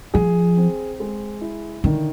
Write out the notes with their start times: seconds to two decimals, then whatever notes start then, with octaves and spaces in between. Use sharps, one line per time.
0.14 F3 G#4
0.57 C4
1.00 G#3
1.41 E4
1.84 D3 D#3